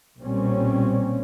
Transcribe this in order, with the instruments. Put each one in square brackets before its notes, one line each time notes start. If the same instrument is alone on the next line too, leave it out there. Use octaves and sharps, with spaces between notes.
[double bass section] B1 A#2 G3 A#3 C4 C#4